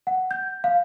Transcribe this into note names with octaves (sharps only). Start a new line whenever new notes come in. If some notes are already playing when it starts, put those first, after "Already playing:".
F#5
G6
F5